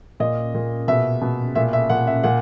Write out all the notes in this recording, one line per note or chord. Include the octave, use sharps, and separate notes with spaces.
A#2 D#5
A#2
B2 E5
B2
A#2 E5
E5
A#2 F#5
E5
A#2 F#5